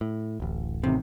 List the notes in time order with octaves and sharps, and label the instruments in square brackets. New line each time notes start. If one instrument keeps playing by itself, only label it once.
[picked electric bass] A2
D1 A1
[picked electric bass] A1 A2 D#3 [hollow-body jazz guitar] C3